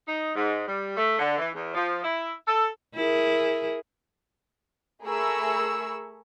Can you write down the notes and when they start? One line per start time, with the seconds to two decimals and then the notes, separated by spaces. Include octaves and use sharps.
0.06 D#4
0.35 G#2
0.67 G3
0.96 A3
1.18 D3
1.38 E3
1.54 E2
1.74 F3
2.04 E4
2.47 A4
2.95 E4 G#4 A#4
5.03 A3 G#4 A#4 B5 C#6 E6